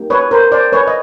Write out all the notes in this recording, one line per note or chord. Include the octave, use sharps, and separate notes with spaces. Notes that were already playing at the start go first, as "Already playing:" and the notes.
Already playing: A#3 D#4 G4
B4 C#5
A#4 C5
C5 D5
B4 C#5
D#5